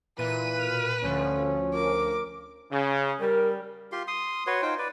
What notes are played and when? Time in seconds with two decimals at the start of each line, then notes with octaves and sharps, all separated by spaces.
0.18 A#2 E3 B4 D#7
0.59 B2 A#4 F6
1.03 D2 D3 F3 C#4
1.74 A#4 D6
2.72 C#3
3.20 G3 A#4
3.92 F4 G4 C6
4.08 C6 D#6
4.47 F#4 B4 C#5 C6
4.62 D#4 F4 C5 G5
4.78 B4 D5